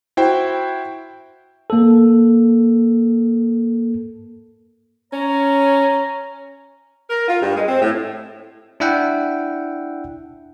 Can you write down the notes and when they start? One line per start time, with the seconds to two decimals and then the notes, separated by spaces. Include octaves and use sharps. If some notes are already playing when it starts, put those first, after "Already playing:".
0.17 E4 F#4 C5 G5
1.70 A#3 A4
5.13 C#4 C#5 A#5
7.09 A#4
7.27 F4
7.41 G2
7.56 G#3
7.67 C4
7.80 A2
8.80 D4 E4 E5 F#5 G5